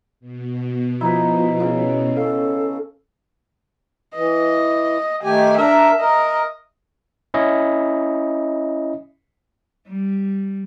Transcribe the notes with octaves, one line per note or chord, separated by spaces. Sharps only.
B2
F3 B3 D#4 E4
C#3
C#4 A4 F5
E3 D#5
D#3 A3 G4 G#5
D4 A#4 E5
A#4 D#5
C#4 E4 D#5
G3